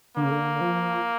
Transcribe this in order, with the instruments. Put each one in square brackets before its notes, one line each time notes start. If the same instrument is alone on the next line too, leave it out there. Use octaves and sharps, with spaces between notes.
[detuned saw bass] D3 [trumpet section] A#3
[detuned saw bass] C#3
D3
F3